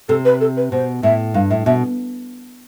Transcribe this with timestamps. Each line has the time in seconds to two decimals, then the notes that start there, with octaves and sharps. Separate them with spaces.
0.09 C3 A4
0.25 B4
0.41 A4
0.57 B4
0.72 B2 C5
1.03 A2 E5
1.34 G2 F5
1.50 A2 E5
1.66 B2 E5